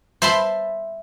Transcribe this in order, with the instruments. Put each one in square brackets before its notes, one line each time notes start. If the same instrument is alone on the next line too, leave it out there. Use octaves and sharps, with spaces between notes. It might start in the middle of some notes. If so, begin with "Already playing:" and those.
[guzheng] C5 E5 A5 B5 C6